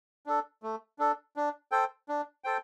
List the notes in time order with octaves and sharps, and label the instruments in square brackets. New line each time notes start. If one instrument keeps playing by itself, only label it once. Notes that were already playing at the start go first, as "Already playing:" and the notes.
[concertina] D4 A4
A3
D4 A4
D4
A4 C5 G5
D4
A4 C5 G5